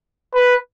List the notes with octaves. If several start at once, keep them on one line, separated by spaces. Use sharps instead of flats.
B4